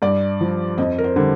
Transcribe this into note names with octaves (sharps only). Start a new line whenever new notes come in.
G2 D5
F3
F2 D#5
A#4
C5
D3 G3